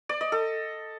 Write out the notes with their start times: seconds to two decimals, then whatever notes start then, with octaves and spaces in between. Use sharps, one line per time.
0.09 D5
0.21 D#5
0.32 A4